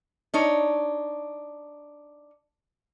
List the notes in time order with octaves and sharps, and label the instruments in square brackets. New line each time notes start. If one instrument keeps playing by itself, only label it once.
[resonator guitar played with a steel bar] D4 D#4 C#5